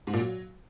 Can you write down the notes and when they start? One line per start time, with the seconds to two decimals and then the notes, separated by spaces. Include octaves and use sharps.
0.07 G#2
0.13 A#2
0.20 F#3